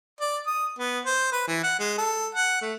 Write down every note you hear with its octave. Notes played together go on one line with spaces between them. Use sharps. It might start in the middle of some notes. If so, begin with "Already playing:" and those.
D5
D#6
B3
C5
B4
E3
F#5
G#3
A4
F#5
A3